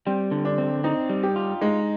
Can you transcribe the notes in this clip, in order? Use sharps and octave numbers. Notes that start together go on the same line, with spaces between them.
G3 C4
D3
D4
C4
C4 D#4
G3
G4
F4
G#3 D#4